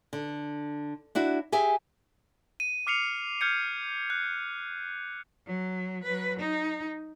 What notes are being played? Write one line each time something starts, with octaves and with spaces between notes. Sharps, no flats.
D3
D4 E4 F#4
G4 G#4 E5 G#5
D#7
D6 F6 C7 C#7 F7
F6 G6 G#6 C#7
F#6
F#3
F#3 B4
D#4